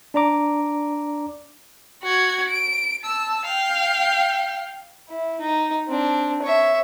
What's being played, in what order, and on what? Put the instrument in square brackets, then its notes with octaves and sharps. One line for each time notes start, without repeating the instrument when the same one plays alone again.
[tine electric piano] D4 D5 A#5 D6
[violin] F#4 G#6
D7
A5 E6
F5 G5
[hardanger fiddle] E4
D#4
C4 D4
C#5 E5